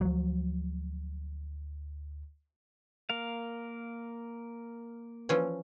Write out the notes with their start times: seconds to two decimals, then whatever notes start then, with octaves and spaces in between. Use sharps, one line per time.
0.01 D2 F3 F#3
3.10 A#3 A#4 F5
5.29 E3 F3 C#4